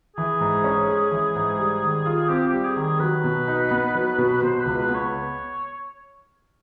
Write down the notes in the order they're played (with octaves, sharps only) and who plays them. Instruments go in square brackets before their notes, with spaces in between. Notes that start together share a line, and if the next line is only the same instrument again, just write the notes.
[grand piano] E3 [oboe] G#4
[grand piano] G#2
C#4
G#3
E3
G#2
G3
D#3
F4
[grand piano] C4 [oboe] G4
[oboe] G4
[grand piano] G3
[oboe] G#4
[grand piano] D#3
[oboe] G#4
[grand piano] F#3 [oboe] B4
[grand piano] B2
D#4
B3
F#3
B2
[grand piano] B2 [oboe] C5
[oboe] B4
[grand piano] C#2
[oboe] B4
[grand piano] B3
[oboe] C#5